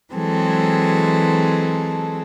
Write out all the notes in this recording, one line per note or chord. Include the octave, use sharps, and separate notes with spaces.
E3 F#3 G#3 C4 G#4 A4